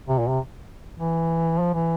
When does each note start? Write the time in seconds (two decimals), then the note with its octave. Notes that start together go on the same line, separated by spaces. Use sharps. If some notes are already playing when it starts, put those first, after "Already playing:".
0.09 C3
0.19 A#2
0.29 C3
0.99 E3
1.59 F3
1.74 E3